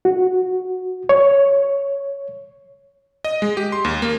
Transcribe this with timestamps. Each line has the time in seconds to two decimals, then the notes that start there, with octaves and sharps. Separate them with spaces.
0.05 F#4
1.09 C#5
3.24 D#5
3.42 G#3
3.57 G4
3.72 C6
3.85 D#2
4.02 A#3